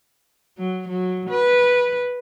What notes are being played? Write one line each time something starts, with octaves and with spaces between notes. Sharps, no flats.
F#3
F#3
B4